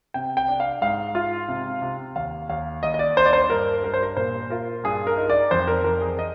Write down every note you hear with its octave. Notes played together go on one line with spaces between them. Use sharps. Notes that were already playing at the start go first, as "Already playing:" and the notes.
C3 G5
G5
D4
F5
G#2 F5
F4
C3
C3
D#2 F5
D#2 F5
D#2 D#5
D#5
D5
D4 C5
D5
C5
G2 A#4
G2 A#4
C5
A#4
A#2 C5
F4 A#4
G2 G#4
A#4
D#4
D5
F2 C5
A#4
F2 A#4
G#4
D#5